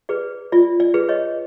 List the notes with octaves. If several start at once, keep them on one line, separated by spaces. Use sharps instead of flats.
G#4 B4 D5
F4 D5
D5
G#4 B4
C#5 D#5